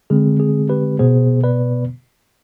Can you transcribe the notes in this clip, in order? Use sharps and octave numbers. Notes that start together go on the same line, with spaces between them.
D3 G#3 C4 G#4
G#4
G4 B4
B2 B3 G#4 C5
B4 D5